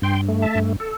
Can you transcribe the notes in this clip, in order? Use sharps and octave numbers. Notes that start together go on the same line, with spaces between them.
G2 G5 C6
A3
E5 A5
G2
A4